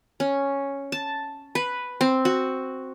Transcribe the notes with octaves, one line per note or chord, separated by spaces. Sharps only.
C#4
A5
B4
C4
F#4